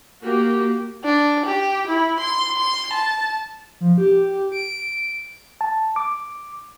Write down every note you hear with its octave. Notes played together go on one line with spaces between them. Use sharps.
A#3 F#4 G4
D4
G4
E4
C6
C6
A5
F3
G4
D7
A5
D6